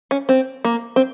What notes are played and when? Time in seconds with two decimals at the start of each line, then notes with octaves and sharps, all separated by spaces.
0.11 C#4
0.29 C4
0.65 A#3
0.96 C4